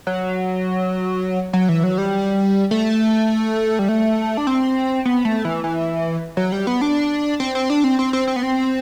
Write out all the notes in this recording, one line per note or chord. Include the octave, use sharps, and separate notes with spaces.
F#3
F#3
E3
F#3
G3
A3
G3
A3
D4
C4
B3
A3
E3
E3
F#3
G3
B3
D4
C4
C4
D4
C4
C4
C4
C4
B3
C4